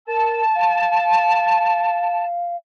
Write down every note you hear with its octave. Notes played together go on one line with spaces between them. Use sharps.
A#4 A5
F5